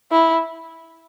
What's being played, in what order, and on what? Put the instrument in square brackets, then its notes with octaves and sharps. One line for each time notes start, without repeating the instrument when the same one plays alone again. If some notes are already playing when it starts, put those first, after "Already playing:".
[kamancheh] E4